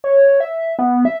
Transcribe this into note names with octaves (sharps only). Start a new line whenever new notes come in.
C#5
E5
B3
E5